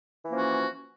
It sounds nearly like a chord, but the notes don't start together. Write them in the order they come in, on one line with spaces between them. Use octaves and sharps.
E3 A#3 C#4 F3 F#4